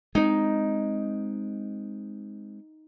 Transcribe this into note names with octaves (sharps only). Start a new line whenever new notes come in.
G#3 A3 C4 D#4